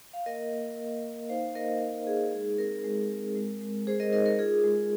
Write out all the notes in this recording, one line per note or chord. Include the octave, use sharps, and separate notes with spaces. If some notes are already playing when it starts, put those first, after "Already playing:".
F5
A#3 A#4 D#5
A#3
A#3
A#3
D#4 C5 F5
A#3 A#4 D#5
D#4 A#4
D#4 G#4
G#3 G#4
C4 A#4
G#3
C4
G#3
G#3
G#3 G#4 C5
A#4 D#5
D#4 A#4 D#5
A#4
F4 G#4
G#3